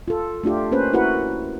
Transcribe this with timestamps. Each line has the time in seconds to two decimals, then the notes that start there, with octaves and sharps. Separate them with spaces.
0.08 F4 A4
0.44 A3 D4 F4 G4
0.72 A#3 C#4 B4 C5
0.93 E4 F#4 A#4 B4 F#5